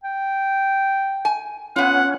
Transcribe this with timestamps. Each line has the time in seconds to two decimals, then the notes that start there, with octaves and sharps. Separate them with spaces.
0.04 G5
1.25 G#5
1.76 B3 C#4 F4 F#5